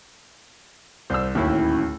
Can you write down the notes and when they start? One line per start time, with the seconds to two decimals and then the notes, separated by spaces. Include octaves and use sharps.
1.10 C2 C5 E6
1.35 D1 D#2 C#4 E4